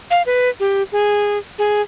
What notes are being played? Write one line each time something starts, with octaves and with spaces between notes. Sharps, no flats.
F5
B4
G4
G#4
G#4